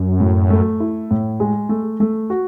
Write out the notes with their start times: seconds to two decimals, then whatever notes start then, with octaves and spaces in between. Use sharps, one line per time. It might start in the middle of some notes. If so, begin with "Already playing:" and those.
Already playing: F#2
0.20 A2
0.50 A3
0.80 E4
1.11 A2
1.40 G#3
1.69 A3
2.00 A3
2.30 F#4